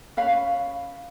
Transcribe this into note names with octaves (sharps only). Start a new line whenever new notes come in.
C#4 B4 F5 B5